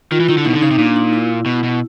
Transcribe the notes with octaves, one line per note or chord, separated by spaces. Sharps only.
D#3 F4
E3
D#3 E4
D3
B2 D#4
D3
C#3 D#4
C3
A#2 D4
D#4
E4
B2
B2